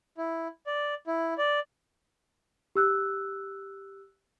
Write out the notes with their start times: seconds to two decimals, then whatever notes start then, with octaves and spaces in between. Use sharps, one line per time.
0.18 E4
0.67 D5
1.07 E4
1.38 D5
2.76 G4 E6 F#6